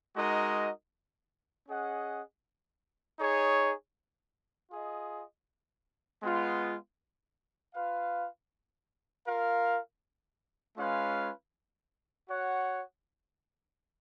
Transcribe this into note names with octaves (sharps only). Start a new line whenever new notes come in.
G#3 D#4 F#4 A#4 D#5
C#4 G#4 D#5 F#5
D#4 G#4 C#5
F4 G#4 D#5
G#3 B3 F4
F4 B4 F5
F4 A#4 F5
G#3 C#4 F4 B4 F5
F#4 C#5 F#5